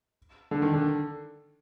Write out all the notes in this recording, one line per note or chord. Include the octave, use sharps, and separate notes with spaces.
D3
D#3
D3